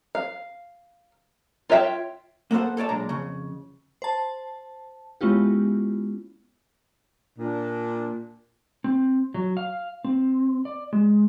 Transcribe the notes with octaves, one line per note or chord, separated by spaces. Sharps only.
F5
F4 C#5 E5 G5
A#3 B3 A4 C5 F#5
A4 C#5 D5 A5
B1 A#2 G#3 D4 A#5
F2 C#3
C5 A5
G#3 B3 C#4 E4 F4 G4
A#2 D4
C4
F#3
F5
C4
D5
G#3